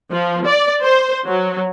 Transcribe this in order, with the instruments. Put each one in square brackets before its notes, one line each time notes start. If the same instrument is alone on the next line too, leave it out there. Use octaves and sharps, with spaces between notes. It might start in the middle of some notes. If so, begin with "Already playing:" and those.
[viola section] F3
D5
C5
F#3